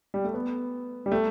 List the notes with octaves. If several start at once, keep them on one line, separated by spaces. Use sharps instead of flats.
G3
A3
B3
G3
A3